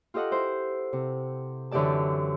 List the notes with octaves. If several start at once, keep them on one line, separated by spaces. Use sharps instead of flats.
F4 G4 A4 D#5 F5 F#5
E4 C5
C3
F#2 D3 E3 G4 D5 A5